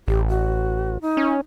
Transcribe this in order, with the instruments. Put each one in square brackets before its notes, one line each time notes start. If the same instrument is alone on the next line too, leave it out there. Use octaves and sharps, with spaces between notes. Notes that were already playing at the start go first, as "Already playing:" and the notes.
[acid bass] A1 [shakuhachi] G4
[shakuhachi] F#4
D#4
[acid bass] C#4